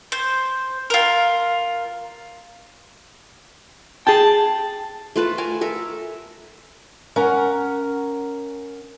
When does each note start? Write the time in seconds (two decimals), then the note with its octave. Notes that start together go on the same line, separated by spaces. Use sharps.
0.12 C5
0.90 F4 A#4
4.07 G#4 G5 A5
5.16 A3 F4 B4 A5
5.38 A#4 G#5 A5
5.61 A4 A#4 E5
7.16 C#4 A#4 F#5 A#5